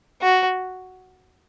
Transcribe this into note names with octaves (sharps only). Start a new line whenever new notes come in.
F#4